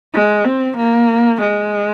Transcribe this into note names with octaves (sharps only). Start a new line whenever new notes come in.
G#3
C4
A#3
G#3